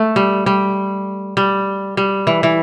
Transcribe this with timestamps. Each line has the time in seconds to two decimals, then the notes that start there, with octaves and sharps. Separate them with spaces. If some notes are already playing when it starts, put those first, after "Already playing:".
Already playing: A3
0.16 G3
0.46 G3
1.37 G3
1.97 G3
2.27 E3
2.43 E3